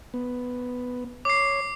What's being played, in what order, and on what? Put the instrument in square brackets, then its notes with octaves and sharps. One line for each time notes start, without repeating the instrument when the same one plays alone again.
[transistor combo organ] B3
[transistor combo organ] C#5 [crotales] D6 C7